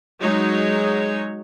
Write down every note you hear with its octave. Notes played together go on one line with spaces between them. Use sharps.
F#3 G#3 D#4 C#5